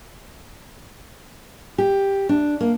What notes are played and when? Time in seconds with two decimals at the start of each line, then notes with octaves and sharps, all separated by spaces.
1.78 G4
2.29 D4
2.60 A#3